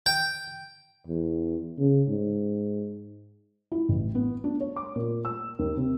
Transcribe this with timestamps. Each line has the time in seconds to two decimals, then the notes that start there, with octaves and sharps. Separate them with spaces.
0.06 G5
1.07 E2
1.78 C#3
2.08 G#2
3.72 E4
3.88 A1
4.15 B3
4.44 D4
4.60 C#5
4.76 D6
4.96 A#2
5.25 E6
5.59 D#2
5.77 C3